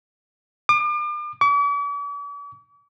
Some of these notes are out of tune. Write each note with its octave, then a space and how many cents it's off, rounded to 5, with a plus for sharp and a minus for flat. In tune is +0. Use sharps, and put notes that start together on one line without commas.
D6 +40
D6 -45